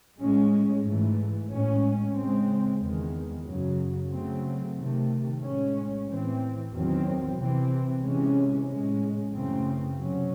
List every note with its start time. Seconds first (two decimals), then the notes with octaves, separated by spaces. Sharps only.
0.18 A2 G#3 C#4
0.85 G#2 E3 A3
1.49 A2 G#3 C#4
2.15 C#3 G#3 C4
2.80 E2 D#3 G#3
3.45 F#2 C#3 F#3
4.10 C#3 F#3 A3 C4
4.76 C3 D#3 A3
5.42 A2 G#3 C#4
6.07 A2 E3 C4
6.73 E2 D#3 F#3 C4
7.37 C3 E3 C4
8.02 C3 E3 G#3 C#4
8.68 A2 G#3 C#4
9.33 F#2 C#3 E3 A3 C4
9.98 C3 F#3 C#4